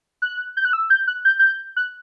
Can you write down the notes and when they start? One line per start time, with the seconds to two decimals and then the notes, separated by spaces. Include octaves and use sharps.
0.22 F#6
0.57 G6
0.65 F#6
0.73 E6
0.90 G6
1.07 F#6
1.25 G6
1.39 G6
1.76 F#6